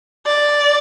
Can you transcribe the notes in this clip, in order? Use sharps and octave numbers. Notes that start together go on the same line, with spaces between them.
D5